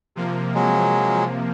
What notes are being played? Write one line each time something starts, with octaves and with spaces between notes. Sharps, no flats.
C3 F3 A#3
F#3 G#3